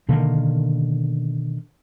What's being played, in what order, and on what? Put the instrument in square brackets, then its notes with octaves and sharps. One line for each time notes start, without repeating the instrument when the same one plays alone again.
[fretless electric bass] B2 D3 D#3 A#3